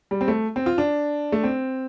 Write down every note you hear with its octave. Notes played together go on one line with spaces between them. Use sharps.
G3
C4
A3
C4
F4
D4
A3
C4